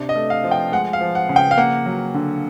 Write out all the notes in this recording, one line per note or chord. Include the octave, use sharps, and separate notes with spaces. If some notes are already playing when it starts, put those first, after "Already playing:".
Already playing: C3 D4
D#5
A3
F5
F3
G5
G#3 F#5
F5
F3
F#5
C#3
G5
F5
A#3 F#5
F#3
D3